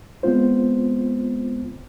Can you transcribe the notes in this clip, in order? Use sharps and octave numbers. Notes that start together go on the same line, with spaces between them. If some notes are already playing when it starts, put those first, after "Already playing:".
G#3 B3 C4 F4 C5